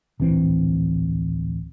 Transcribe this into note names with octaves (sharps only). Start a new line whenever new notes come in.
D1 A#1 E3 C4